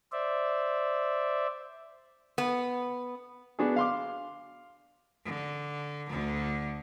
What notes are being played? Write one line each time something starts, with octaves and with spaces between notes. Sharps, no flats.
C5 D5 E5
B3
B3 D4 F#4 G#4
F5 C6 D6
D3
D2 D3